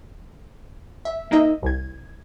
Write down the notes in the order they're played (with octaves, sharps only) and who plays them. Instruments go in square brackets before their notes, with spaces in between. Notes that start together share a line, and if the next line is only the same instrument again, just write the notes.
[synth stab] E5
A#3 D#4 D#5 E5
C2 G#6